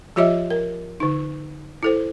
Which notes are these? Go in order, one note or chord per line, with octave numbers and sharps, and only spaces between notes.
F3 F4 G4 C#5 D#5 E5
A#4
D3 D#4
E4 A4 C5